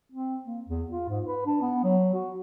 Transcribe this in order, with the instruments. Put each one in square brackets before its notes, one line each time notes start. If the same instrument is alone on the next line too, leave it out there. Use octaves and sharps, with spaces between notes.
[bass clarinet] C4
A#3
E2
F4
G#2
B4
D4
B3
F#3
F#4